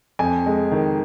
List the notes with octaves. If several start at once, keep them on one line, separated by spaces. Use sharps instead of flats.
F2 G#5
G#3
D#3